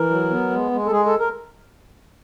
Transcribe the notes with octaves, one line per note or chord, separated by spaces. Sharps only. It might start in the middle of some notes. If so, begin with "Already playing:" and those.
Already playing: E3 A#4
F#3
B3
G#3
G#3
A4
G#3 G#4
A4
A#4